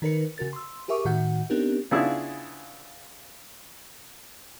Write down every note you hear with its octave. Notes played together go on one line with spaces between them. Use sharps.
D#3 D#4 A#4 B4 C#7
C#3 F#4 A#4 A6
C6 E6
G4 G#4 A#4 E5 C#6 D6
A2 D#3 F#4 E5 F#5 G6
B3 C4 D4 D#4 G4 A#4
C#3 B3 D4 E4 F4 G#4